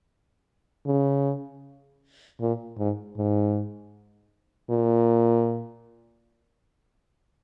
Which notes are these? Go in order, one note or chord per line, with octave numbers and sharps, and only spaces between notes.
C#3
A#2
G#2
G#2
A#2